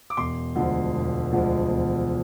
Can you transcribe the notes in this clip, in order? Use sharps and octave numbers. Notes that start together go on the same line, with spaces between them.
D6
E1 C6
D2 D3 F3 G#3
E1
D2 D3 F3 G#3
E1